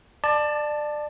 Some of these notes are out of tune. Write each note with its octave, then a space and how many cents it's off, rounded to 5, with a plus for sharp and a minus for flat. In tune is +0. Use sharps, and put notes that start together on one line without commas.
D5 +25 A5 +0